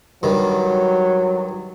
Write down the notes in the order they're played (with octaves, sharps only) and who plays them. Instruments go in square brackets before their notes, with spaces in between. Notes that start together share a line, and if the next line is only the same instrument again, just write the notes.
[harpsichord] G2 D#3 [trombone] F#3